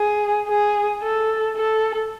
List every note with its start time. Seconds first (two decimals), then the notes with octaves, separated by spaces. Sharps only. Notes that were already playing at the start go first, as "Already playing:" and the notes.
Already playing: G#4
0.48 G#4
1.03 A4
1.57 A4